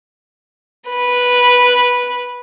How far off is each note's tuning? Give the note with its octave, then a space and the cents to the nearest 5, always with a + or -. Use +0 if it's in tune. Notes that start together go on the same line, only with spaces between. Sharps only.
B4 -10